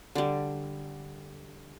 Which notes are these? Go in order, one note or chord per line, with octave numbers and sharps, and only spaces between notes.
D3 G3